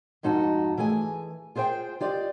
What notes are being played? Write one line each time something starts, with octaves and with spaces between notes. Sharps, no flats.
F2 G#2 D#4 F#4 A5
E3 A3 G#4 G#5
F4 G#4 C5 D#5 G5
F4 G4 D5 D#5